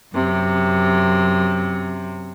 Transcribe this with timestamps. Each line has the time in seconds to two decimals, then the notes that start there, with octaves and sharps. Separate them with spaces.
0.13 F#2 C3